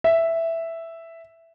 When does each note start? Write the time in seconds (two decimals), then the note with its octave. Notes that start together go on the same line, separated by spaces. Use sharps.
0.04 E5